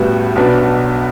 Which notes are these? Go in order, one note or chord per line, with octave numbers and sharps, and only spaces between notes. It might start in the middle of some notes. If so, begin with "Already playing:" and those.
Already playing: A1 A2 G3 B3 F#4
B1 B2 F#3 B3 D4